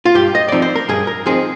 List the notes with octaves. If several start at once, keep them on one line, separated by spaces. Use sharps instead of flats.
F4
G2 G4
D#5
F3 C4 D#4 D5
C5
A#4
G2 G#4
A#4
F3 C4 D#4 G#4